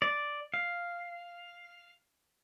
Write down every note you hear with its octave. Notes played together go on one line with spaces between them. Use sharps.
D5
F5